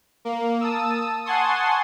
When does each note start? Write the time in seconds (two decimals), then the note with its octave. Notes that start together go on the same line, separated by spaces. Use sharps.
0.25 A#3
0.61 A5 D#6 E6
1.25 F#5 G#5 A5 C6 C#6 D#6